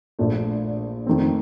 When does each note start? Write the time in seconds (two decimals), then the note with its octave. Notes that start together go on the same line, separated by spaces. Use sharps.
0.19 A#1 A#2 A3 D4
1.07 F2 D#3 A3 C4